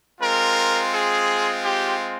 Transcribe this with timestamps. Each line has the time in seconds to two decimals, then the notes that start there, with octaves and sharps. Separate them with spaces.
0.20 G#3 C4 F4 A#4
0.91 G#4
1.62 G4